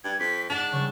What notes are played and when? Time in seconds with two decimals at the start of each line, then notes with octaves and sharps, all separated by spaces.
0.04 G2 G#6
0.20 F2 B6
0.50 G#2 D4 F#5 A5 E6
0.72 C#3 G3 C#6